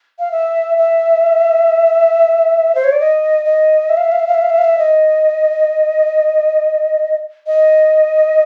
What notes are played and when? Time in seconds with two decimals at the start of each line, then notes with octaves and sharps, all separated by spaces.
0.19 F5
0.32 E5
0.77 E5
2.75 C5
2.84 C#5
2.92 D5
3.00 D#5
3.45 D#5
3.89 E5
3.97 F5
4.04 E5
4.12 F5
4.20 E5
4.27 F5
4.34 E5
4.42 F5
4.50 E5
4.58 F5
4.64 E5
4.78 D#5
7.47 D#5